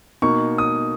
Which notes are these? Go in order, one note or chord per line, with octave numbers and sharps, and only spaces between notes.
B2 A#3 D#4 C#6
D#6